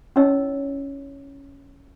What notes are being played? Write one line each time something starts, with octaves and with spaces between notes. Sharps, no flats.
C#4 D#4 E4 C#5 D#5 E6